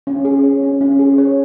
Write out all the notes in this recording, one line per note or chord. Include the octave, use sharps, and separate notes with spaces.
C#4
G#4
C#5
C#4
C#4
G#4
C#5